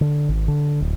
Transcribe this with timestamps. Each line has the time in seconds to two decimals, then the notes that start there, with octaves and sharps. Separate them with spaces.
0.01 D3
0.29 G#1
0.48 D3
0.80 D1